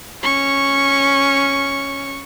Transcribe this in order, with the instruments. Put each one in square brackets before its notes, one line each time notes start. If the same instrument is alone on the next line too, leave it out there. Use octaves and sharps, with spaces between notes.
[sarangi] C#4 [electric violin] C#6